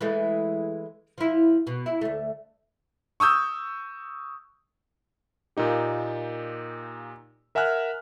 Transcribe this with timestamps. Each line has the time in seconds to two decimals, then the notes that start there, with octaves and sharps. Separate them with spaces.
0.01 E3 G#3 A3
1.18 F3 E4
1.67 B2
1.86 E4
2.01 D2 A3
3.20 C#6 D#6 E6 G6
5.57 A#2 A#3 D#4 G4
7.55 A#4 E5 F#5 G#5 F6 F#6